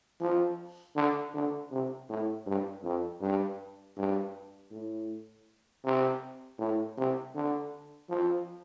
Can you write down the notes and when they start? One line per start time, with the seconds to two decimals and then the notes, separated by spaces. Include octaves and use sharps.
0.21 F3
0.96 D3
1.34 D3
1.71 C3
2.09 A2
2.46 G2
2.84 F2
3.21 G2
3.97 G2
4.71 A2
5.84 C3
6.59 A2
6.97 C3
7.35 D3
8.09 F3